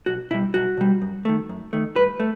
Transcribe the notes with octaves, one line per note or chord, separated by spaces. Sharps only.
B1 F#4
B2 G3 E4
B1 F#4
B2 G3
F#2
D#3 A3
F#2
D#3 A3
G2 B4
A3